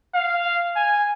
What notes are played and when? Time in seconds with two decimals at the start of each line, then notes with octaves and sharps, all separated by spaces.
0.14 F5
0.76 G#5